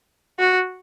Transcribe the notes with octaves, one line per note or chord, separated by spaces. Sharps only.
F#4